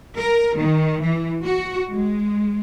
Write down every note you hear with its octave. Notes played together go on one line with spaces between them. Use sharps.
A#4
D#3
E3
F#4
G#3